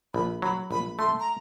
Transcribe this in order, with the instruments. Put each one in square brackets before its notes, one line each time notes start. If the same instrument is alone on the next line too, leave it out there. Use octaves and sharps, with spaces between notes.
[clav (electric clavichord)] A#1 [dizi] B5
[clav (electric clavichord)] F#3 [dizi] B5
[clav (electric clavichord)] A#1 [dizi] B5
[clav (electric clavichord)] A3 [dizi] C6
[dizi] A#5